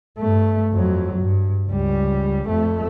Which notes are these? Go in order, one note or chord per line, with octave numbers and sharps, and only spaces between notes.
G2 A3
F2 F#3
G2
C#2 G3
F2 A3